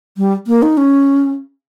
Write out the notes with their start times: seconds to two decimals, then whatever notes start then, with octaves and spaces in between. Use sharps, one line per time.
0.18 G3
0.47 A#3
0.62 D#4
0.77 C#4